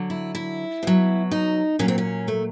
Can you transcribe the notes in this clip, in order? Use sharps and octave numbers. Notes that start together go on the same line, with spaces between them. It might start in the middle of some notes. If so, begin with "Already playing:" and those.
Already playing: D3 F#3
E4
E4
B2 F#3
D#4
A#2 F#3 C#4
C4
C#4
A3